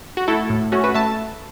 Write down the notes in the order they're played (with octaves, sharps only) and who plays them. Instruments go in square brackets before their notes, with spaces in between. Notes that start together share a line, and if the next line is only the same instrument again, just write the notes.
[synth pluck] F#4
A3 E4 A4
A2
A3 C#4 F#4
F#4 B4
A3 E5 A5